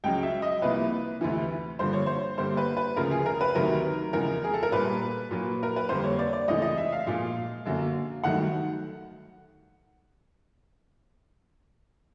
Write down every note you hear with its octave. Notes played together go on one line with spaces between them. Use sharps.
C#2 C#3 F#3 G5
E5
D#5
C2 C3 F3 A#3 B4
D2 C3 E3
G2 D3 F3 A#3 C5
C#5
C5
G2 D3 G3 A#3 C5
B4
B4
D2 C#3 F3 A#4
G#4
A#4
B4
D2 C3 D#3 F#3 A#4
E2 C#3 F3 G#3 A#4
G#4
A4
A#4
A#2 G3 A#3 B4
A#2 F#3 A#3
A#4
B4
F2 D3 G3 A#3 C5
C#5
D5
D5
C#2 C3 E3 A3 D#5
D#5
E5
F5
A#2 F3 G#3 F5
F#2 D3 F#3 A#3
G2 D#3 F#3 A3 F#5